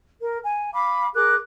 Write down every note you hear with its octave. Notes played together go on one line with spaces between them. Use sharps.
A#4
G#5
F5 B5 D6
G#4 A#4 D6 F#6